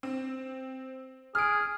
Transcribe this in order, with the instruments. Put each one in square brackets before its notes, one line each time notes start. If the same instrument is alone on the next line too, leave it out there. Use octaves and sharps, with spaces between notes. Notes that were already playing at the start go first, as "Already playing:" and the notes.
[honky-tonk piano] C4
[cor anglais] G#4 [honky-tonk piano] F6 D7